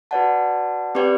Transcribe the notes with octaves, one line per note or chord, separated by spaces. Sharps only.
F#4 B4 D5 F#5 A5
C4 G4 B4 D5 G5